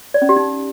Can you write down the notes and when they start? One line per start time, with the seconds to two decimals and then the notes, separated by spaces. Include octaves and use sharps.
0.14 D5
0.22 C#4
0.29 G4
0.36 D#4